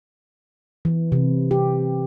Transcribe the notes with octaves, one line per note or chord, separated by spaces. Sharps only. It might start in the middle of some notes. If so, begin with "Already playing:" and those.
E3
C3
G4